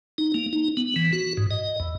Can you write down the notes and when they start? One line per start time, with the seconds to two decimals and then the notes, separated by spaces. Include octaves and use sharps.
0.18 D#4
0.34 A#3
0.53 D#4
0.77 B3
0.96 E3
1.13 F#4
1.37 G#2
1.51 D#5
1.80 E2